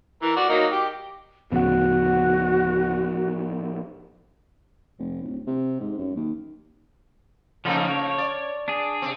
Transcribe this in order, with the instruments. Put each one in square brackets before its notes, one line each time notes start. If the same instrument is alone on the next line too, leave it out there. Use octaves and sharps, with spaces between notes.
[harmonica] E3 A#4
F#4 D5
F#3 A#3 D#4
G4
[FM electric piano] D2 C#3 F#5 [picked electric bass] A2 F3 B3 [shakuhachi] F#4
[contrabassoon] F1
D1
C3
G#2
F#2
D#2
[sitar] C#3 A3 A#3 [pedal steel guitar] F3 C#4 D#4
[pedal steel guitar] C#5
[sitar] D5
[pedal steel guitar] D4 G#4
[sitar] C3 C4